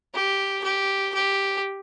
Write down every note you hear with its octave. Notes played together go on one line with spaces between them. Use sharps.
G4
G4
G4